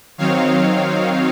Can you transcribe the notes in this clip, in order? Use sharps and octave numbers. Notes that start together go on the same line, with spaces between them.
D#3 F#3 C4 D#4 C#5 F5